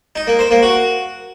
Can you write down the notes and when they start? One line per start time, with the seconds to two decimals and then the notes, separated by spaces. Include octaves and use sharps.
0.16 D#4
0.27 A#3
0.39 C5
0.51 A#3
0.63 F#4